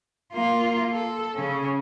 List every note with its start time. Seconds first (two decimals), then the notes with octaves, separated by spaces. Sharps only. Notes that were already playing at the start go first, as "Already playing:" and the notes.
0.33 A#3 F4
0.92 A4
1.34 C#3 C#4